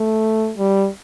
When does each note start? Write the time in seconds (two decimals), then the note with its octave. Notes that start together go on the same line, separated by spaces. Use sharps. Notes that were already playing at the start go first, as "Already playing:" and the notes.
Already playing: A3
0.58 G3